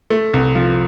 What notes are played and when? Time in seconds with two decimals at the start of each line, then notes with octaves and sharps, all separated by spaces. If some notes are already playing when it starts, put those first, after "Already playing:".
0.10 A3
0.34 C2
0.55 F3